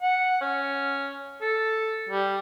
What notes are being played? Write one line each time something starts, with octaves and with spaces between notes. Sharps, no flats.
F#5
C#4
A4
G3